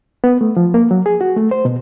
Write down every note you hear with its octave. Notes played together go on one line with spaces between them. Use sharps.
B3
A3
F3
A#3
F#3
G#4
F#4
A3
C5
B2